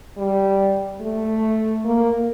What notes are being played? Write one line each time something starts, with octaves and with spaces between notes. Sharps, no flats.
G3
A3
A#3